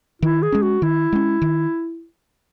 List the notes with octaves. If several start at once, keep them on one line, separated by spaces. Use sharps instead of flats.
D#3 E4
G#4
G#3 C#4
F#4
D#3 E4
G#3 C#4
D#3